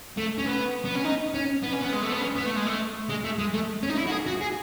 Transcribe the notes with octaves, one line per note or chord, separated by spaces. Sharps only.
A3
C#4
B3
B3
C#4
D#4
C#4
B3
C#4
B3
G#3
A3
B3
C#4
B3
A3
G#3
A3
G#3
A3
G#3
A3
C#4
D#4
E4
F#4
G#4
F#4
G#4